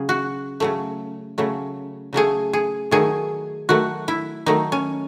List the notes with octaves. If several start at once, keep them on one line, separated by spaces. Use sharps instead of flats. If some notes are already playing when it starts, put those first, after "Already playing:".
Already playing: C#3 F#3 G#4
F#4
C#3 F#3 A3
C#3 F#3 A3
C#3 F#3 A3 G#4
G#4
D#3 F#3 A3 G#4
D#3 F#3 A3 F#4
E4
D#3 F#3 A3 D#4
C#4